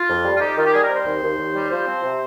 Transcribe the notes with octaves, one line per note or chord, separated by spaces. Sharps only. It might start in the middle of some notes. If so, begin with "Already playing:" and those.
Already playing: F4
F2
G3
F4
D#4 G4
D#3 F4
G4
G3 G#4
A#4
C4
C5
D#2
D#2
D#2
G3
F3 C5
C4
C3